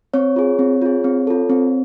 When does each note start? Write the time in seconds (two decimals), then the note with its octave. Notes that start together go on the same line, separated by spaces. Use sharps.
0.14 C4 C#5
0.36 F4 G#4
0.59 C4
0.82 F4 G#4
1.04 C4
1.27 F4 A4
1.50 C4